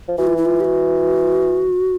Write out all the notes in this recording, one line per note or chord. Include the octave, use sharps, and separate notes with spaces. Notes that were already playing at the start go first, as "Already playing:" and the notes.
F3
E3 F#4
F4
E4
F4
G4
F#4